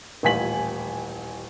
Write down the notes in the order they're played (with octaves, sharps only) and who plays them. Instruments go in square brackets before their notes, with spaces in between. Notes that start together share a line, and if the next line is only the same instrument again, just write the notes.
[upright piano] D#1 A1 F4 G#5 B6 F#7